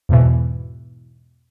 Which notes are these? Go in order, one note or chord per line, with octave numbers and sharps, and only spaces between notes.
E2 G#2 B2 E3